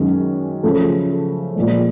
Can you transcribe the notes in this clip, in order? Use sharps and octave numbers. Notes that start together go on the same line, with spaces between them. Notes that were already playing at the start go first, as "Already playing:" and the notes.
Already playing: F#2 D#3 G#3 C#4
C#3 F3 A3
A#2 F3 G#3